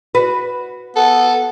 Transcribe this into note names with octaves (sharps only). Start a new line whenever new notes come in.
F#4 B4
B3 A4